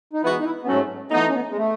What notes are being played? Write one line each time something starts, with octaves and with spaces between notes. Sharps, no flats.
D#4
E3 G#3 B3 E4 F#4
D#4
E4
B3
G#2 F#3 A3 C#4
E3 A3 B3 D#4
C#4
B3
G#3
A3